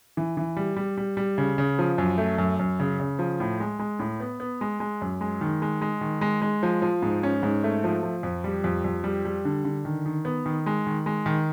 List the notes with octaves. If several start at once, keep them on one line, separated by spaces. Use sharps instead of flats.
E3
E3
G3
G3
G3
G3
C#3
C#3
F3
F#2
A3
F#2
F#2
C#3
C#3
F3
A2
G#3
G#3
A2
B3
B3
G#3
G#3
F#2
G#3
D#3
G#3
G#3
D#3
G#3
G#3
F3
F3
G#2
C#4
G#2
A3
F3
F3
F2
G3
F2
F2
G3
G3
D3
D3
D#3
D#3
B3
D#3
G#3
D#3
G#3
D#3